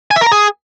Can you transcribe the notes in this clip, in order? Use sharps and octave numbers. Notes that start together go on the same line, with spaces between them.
G#5
E5
A#4
A#5
G#4